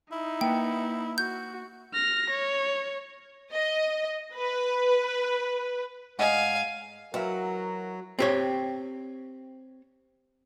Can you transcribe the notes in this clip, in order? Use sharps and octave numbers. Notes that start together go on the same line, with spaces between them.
D#4 E4
A#3 B4 F#5 G5
F#4 G6
F6 A#6
C#5
D#5
B4
G#2 D#5 F5 F#5 G#5
E3 F#3 F#4 A#4 E5 F5
C4 G4 C#5